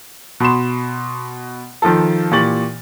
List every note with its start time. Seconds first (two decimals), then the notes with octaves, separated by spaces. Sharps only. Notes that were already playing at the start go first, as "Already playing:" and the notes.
0.40 B2 B5 C6 E7
1.82 D#3 F3 F4 A4
2.31 A#2 E3 G4 C#6 A6 F#7